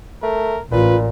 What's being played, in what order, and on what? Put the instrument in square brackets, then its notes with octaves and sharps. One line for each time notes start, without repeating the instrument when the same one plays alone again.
[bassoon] A3 [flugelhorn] A#4
[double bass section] A1 [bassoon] A#2 [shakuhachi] F4 [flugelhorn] B4